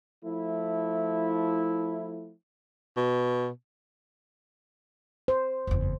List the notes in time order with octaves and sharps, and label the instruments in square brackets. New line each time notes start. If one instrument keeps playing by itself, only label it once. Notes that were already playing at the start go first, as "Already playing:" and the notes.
[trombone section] F3 A3 E4
[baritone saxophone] B2
[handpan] C5
[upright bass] F#1 E2